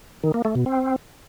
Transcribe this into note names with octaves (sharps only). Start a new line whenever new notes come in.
D#3
A#3
A3
B2
C4